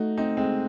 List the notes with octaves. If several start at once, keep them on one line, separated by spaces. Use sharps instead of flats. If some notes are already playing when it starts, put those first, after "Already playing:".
Already playing: A3 D#4 F#4
C4 D#4
G#3 C4